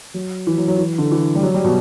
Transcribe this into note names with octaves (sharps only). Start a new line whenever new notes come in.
F#3
E3
F#3
F#3
E3
D3
E3
G3
F#3
G3
B2